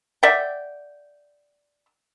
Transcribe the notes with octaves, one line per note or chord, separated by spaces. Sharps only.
D5 E5 F#5 G5